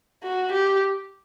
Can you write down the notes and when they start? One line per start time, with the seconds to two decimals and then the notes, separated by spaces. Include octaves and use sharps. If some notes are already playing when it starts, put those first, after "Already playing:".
0.24 F#4
0.53 G4